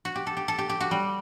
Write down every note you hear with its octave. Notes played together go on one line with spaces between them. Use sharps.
F#4
G4
A4
G4
A4
G4
G4
F#4
G3